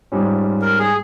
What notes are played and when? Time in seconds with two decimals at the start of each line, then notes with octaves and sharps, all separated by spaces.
0.12 G#2 G3 C#4 F4
0.61 A#4
0.79 G#4